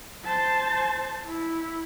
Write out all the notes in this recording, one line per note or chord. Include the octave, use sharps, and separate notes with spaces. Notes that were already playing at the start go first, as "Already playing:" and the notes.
C5 A5
E4